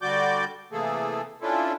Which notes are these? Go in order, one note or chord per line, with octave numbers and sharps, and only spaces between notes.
D3 G3 F#4 D5 D6 G6
C3 E3 A3 A#3 G#4 A4
C#4 D4 E4 F4 A4